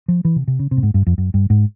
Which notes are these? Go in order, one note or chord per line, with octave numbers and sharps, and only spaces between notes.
F3
E3
C3
C3
C#3
C3
A2
G#2
G2
F2
F#2
G2
G#2